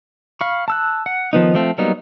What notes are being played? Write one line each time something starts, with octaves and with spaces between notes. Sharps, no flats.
F5 B5 C#6
A5 E6 F#6
F#5
D#3 F3 B3 D#4
F3 A3 C4
F#3 G3 A#3 B3 D#4